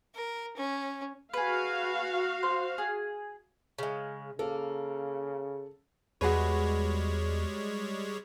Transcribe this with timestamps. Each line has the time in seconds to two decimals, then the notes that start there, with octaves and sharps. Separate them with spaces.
0.14 A#4
0.57 C#4
1.33 F#4 G#4 B4 F5
2.43 C5
2.78 G#4
3.78 C#3 G#3
4.39 C#3 A#3 A4
6.21 E2 G3 G#3 F#4 G#4 B4 C#5